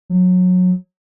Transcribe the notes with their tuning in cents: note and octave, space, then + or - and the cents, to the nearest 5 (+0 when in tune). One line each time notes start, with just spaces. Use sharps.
F#3 -25